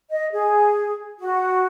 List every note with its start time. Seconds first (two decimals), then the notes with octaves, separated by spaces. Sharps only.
0.11 D#5
0.32 G#4
1.20 F#4